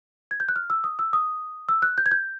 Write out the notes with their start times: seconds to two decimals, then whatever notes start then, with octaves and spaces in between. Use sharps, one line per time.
0.31 G#6
0.40 G6
0.49 F#6
0.56 F6
0.70 E6
0.84 D#6
0.99 E6
1.13 D#6
1.69 E6
1.82 F#6
1.98 G6
2.06 G#6
2.11 G6